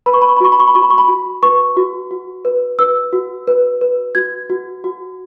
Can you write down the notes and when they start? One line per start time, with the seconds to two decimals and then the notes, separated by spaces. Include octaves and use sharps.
0.06 B4 B5
0.14 C#6
0.21 B5
0.29 C#6
0.37 B5
0.41 F#4 C#6
0.52 B5
0.60 C#6
0.67 B5
0.75 F#4 C#6
0.83 B5
0.90 C#6
0.98 B5
1.08 F#4
1.43 B4 C#6
1.77 F#4
2.11 F#4
2.45 B4
2.79 B4 E6
3.13 F#4
3.47 B4
3.81 B4
4.15 F#4 G#6
4.50 F#4
4.84 F#4